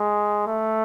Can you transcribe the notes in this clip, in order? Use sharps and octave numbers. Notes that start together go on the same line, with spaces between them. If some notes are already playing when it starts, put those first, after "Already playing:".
Already playing: G#3
A3